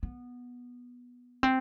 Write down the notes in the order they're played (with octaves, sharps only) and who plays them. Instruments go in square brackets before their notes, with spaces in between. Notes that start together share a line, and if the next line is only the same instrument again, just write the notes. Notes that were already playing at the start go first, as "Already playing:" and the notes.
[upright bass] B3
C4